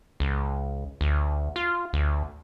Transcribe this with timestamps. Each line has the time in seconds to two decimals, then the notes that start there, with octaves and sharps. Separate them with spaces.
0.20 C#2
1.01 D2
1.56 F4
1.93 D2